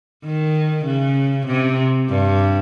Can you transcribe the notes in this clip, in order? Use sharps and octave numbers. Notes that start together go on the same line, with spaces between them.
D#3
C#3
C3
G2